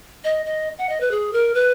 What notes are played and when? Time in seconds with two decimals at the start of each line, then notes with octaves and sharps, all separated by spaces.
0.24 D#5
0.46 D#5
0.78 F#5
0.89 D#5
1.00 B4
1.11 G#4
1.33 A#4
1.54 B4